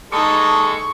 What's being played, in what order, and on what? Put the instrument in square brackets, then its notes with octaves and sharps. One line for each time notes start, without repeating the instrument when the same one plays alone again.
[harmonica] G#3 A4 [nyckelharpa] D#4 D#6 [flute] A5 [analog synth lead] C#6